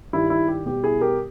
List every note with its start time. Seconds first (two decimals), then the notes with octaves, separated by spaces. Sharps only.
0.13 G2 D#3 G3 E4
0.30 E4
0.48 G4
0.66 B2 G3 G4
0.83 E4 G#4
1.01 G4 A#4